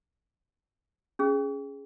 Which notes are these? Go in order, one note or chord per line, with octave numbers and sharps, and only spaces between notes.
C#4 G#4